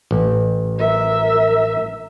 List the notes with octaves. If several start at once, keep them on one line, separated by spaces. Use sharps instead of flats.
A1
A#4 E5